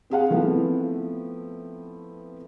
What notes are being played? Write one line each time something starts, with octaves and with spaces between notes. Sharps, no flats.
C4 G#4 F5 F#5
F3 A3 B3 C4 E4